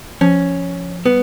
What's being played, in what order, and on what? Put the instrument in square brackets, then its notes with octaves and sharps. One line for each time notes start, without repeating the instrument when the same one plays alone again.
[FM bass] F3 [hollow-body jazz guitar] C#4
[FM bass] G3 [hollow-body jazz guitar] B3